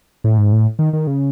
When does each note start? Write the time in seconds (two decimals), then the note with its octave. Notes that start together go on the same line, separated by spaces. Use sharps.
0.24 A2
0.38 G#2
0.52 A2
0.79 D#3
0.93 D#3
1.07 C#3